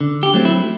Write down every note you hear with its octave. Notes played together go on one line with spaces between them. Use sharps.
D3
G4
F#3 A3 C4
E4